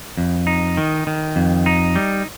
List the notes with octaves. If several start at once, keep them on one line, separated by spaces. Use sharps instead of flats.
F2
D#4
D#3
D#3
F2
D#4
G3